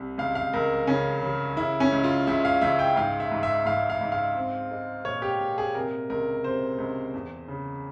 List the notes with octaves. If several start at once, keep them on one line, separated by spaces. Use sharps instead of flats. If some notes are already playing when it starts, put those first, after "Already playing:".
Already playing: C2
C#2 F5
F5
C#2 A#4
C#3 C#4
C#3
C#3 E4
C#4
C#2
F4
C#2 E5
F5
C#2 E5
G5
G#2 F5
E5
G#2
E5
G#2 F5
F5
G#2
F5
C4
G#3
A#2 C#5
G4
A#2
G#4
C3 A#4
C#2 A#4
C3 C5
C#2
E2
C#3